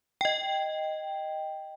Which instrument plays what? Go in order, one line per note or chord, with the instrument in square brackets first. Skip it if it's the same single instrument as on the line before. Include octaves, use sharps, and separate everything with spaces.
[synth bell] D#5 G5